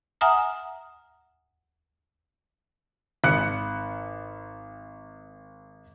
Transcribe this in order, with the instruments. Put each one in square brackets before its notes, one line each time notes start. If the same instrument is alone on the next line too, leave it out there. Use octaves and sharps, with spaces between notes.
[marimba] E5 F#5 G#5 A#5 D#6 F6
[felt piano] G#1 F#6 C#7